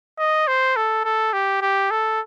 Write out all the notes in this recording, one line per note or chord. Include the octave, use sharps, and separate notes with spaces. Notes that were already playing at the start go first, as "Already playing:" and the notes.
D#5
C5
A4
A4
G4
G4
A4